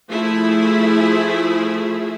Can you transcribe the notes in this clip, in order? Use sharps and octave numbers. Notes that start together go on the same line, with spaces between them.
F3 A3 E4 G#4 E5